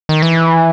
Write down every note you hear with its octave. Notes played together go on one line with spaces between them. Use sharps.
D#3
E3